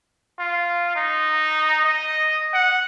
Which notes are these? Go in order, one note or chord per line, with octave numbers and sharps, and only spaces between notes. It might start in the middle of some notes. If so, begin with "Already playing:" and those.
F4
D#4
D#5
F#5